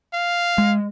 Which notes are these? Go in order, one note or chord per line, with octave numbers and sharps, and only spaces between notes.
F5
G#3